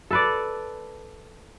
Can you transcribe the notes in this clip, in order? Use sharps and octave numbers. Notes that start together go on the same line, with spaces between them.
A4 B4 D5